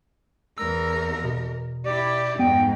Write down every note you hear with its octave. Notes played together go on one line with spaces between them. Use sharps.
E2 A#4 E6
B2
E4 G4 D5
F2 G#2 B3 G5